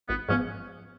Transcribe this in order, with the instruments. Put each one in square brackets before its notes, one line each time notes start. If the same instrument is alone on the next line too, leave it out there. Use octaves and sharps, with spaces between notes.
[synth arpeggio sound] G#1 [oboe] B3
[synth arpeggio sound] G#2 F3 B3 [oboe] C#4